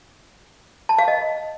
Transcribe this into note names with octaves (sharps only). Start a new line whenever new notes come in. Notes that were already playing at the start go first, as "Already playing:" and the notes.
A5
F5
D#5